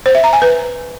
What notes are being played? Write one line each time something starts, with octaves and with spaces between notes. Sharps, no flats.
C5
E5
A#5
G#5
B4